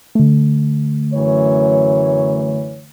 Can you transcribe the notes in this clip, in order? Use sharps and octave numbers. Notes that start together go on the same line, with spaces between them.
D3 A3
F#2 E3 C#5